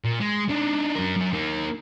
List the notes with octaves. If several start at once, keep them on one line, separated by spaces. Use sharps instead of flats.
A#2
G#3
D4 D#4
F#2 A#4
F#2 C#4
A#3 D#4